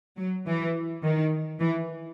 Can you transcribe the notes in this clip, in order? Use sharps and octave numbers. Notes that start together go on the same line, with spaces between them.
F#3
E3
D#3
E3